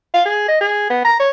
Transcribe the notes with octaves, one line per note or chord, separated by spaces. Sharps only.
F5
G#4
D#5
G#4
B3
A#5
C#5